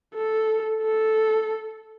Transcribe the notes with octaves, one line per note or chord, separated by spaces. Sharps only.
A4
A4